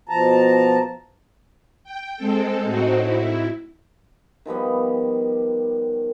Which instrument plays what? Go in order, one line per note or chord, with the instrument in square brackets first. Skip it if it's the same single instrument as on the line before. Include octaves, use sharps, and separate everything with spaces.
[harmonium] B2 F3 A5 A#5
[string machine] G5
G#3 C4 A4
A2 C4 D#4 F#4
E4
[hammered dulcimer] D#3 F3 G3 B3